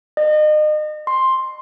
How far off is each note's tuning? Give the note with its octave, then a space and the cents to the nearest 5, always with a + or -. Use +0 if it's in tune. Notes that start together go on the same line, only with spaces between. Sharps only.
D#5 -35
C6 +5